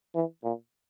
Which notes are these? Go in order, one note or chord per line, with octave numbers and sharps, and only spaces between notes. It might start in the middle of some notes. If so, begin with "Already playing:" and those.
E3
A#2